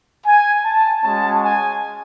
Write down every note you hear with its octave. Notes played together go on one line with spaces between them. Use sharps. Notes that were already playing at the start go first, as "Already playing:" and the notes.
G#5
A5
G#3 C#4 F#4 A5
G#5